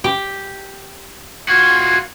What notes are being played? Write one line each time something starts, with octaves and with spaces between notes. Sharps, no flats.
G4
F4 F#4 G#6